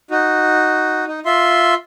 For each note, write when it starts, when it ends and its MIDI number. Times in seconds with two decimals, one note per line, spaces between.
0.11 1.05 63
0.11 1.05 66
1.07 1.20 63
1.25 1.74 65
1.25 1.74 76
1.25 1.74 84